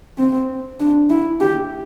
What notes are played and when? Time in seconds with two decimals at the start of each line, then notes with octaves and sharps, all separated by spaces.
0.18 C4
0.80 D4
1.10 E4
1.41 G4